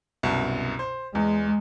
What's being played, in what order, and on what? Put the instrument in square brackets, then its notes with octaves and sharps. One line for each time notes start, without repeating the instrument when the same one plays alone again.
[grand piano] C2 F#2 B2
C5
[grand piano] E2 [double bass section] G#3